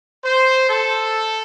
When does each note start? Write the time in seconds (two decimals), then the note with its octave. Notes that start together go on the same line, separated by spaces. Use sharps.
0.25 C5
0.69 A4